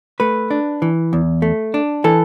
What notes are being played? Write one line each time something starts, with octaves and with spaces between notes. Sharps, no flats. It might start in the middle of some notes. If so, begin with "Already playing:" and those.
A3 B4
D4
E3
E2
A3
D4
E3 A4